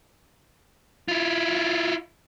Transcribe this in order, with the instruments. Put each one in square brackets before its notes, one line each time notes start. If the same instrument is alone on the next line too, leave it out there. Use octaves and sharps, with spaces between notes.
[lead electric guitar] E4 F4